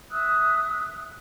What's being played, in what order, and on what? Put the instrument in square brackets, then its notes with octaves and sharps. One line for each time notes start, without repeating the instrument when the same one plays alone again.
[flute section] E5 D#6 E6 F#6